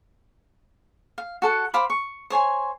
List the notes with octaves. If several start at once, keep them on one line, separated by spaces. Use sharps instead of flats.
F5
F#4 A4 F#5
C5 F5 B5 D6
C#6
C5 C#5 G#5 C6